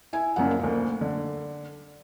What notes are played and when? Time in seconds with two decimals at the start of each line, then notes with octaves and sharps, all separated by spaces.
0.13 E4 G#5
0.36 F#1 F#2 A#2 F3 F#5
0.59 D2 A#2
1.01 D3